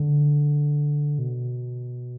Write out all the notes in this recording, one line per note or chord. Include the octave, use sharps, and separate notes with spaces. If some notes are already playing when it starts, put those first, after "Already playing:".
Already playing: D3
B2